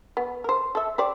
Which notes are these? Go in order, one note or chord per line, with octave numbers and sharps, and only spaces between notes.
B3
A#4 C5
A4 E5
G4 C5 D5